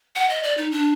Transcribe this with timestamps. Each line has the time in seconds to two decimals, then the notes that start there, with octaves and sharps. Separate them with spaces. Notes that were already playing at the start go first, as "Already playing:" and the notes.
0.15 F#5
0.30 D#5
0.43 D5
0.57 D#4
0.71 D4